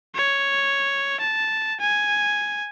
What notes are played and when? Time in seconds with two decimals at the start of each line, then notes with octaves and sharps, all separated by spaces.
0.15 C#5
1.20 A5
1.81 G#5